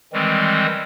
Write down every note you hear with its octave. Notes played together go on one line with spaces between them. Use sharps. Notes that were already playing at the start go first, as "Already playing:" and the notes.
D#3 E3 G3 G#3 C4